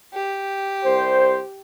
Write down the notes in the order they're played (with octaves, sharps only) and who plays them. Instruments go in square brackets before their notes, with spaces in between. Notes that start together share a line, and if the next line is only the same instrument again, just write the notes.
[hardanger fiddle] G4
[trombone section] C2 C5